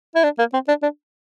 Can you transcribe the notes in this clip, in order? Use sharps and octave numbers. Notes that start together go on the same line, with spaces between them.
E4
D4
A#3
C4
D4
D4